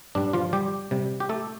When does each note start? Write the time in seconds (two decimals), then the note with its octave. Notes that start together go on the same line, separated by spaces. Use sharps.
0.15 G2 G3 D4
0.33 F3 F4
0.53 G3 G4
0.91 C3 G3
1.20 G4
1.29 A3 A4